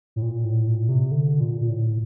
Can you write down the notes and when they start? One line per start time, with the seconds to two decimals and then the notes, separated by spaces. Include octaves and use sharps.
0.16 A2
0.22 A#2
0.44 A2
0.67 A#2
0.89 C3
1.11 D3
1.41 A#2
1.61 A#2
1.69 A2